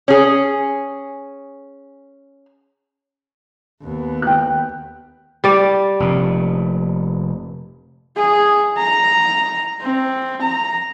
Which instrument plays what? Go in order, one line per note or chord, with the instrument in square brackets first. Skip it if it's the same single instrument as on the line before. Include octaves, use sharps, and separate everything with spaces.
[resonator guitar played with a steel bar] C#4 G#4
[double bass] D#2 B3
[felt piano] G5 F#6
[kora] G3 D5
[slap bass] F1 A#2
[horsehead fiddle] G#4
A#5
C4
A#5